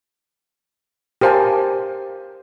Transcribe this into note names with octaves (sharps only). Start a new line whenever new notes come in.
G4 A#4 C5 F5 G#5 A5